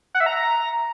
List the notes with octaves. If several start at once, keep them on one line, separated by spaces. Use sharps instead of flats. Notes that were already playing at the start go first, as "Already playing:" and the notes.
F#5
E5
A#5